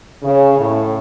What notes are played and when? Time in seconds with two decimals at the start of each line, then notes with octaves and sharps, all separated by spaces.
0.23 C#3
0.58 A2